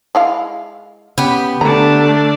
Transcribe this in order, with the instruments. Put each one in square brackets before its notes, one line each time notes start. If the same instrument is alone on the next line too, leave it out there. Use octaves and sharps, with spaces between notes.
[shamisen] G#3 E4 F5
[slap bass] C#3 [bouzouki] B3 G4
[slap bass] D3 [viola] A3 D4 [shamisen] A#5